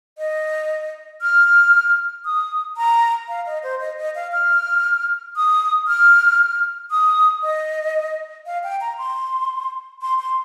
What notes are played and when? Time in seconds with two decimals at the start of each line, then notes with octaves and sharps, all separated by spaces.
0.18 D#5
1.21 F6
2.25 D#6
2.77 A#5
3.28 F5
3.46 D#5
3.63 C5
3.81 D#5
3.98 D#5
4.15 F5
4.32 F6
5.36 D#6
5.87 F6
6.91 D#6
7.43 D#5
8.46 F5
8.64 G5
8.81 A#5
8.98 C6
10.02 C6
10.19 C6